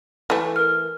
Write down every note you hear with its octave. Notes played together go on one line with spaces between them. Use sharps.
E3 A3
A#4 F6